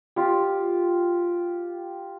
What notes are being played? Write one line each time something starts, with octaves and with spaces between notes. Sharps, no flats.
F4 G4